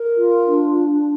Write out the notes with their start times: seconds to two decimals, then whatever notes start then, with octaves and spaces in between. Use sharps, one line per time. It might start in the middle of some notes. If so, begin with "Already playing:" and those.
Already playing: A#4
0.16 F4
0.47 D4